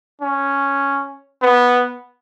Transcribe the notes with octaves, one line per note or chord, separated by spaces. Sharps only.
C#4
B3